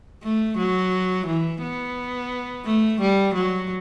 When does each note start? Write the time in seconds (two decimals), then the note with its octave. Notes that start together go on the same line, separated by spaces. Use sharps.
0.23 A3
0.58 F#3
1.27 E3
1.62 B3
2.66 A3
3.01 G3
3.34 F#3